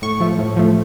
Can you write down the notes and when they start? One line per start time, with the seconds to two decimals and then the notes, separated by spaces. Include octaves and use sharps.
0.02 A2 C#6
0.20 F3 A3
0.39 A2
0.56 F3 A3